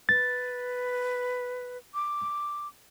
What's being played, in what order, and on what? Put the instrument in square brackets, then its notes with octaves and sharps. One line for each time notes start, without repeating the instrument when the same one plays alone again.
[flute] B4 [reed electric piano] A6
[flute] D6